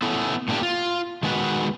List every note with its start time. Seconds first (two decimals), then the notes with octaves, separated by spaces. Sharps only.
0.02 A3 B3 C#4 E4 A4
0.48 A2 A#3 C4 D4 G4
0.63 F4
1.23 D#3 G#3 B3 F#4 B4